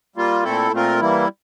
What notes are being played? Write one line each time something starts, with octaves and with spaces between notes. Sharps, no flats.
G3 A#3 F4
A#2 A3 C4 E4 A4
A#2 A3 C4 F4 A#4
E3 G3 A#3 E4